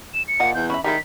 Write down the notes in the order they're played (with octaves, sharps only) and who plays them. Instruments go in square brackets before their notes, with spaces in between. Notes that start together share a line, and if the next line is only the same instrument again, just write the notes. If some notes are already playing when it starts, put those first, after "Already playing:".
[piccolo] E7
C#7
[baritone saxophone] A#2 [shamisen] F3 D#5 F#5
[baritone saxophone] E2 [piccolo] G6
[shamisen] C#4 E5 [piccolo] B5
[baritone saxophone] D#3 [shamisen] G3 G#3 E4 [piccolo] B6